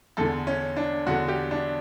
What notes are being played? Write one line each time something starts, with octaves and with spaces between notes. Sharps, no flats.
E2 D3 A4
C#4
D4
E2 D3 F#4
G4
D4